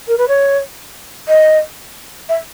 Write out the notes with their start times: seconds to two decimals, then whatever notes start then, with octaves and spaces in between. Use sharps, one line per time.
0.08 A#4
0.18 B4
0.28 C#5
1.28 D#5
2.29 E5